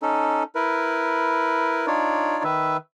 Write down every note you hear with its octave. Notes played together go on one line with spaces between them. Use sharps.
C#4 D#4 A4
E4 A#4 B4
D4 D#4 F4 C#5 D5
D#3 B4 E5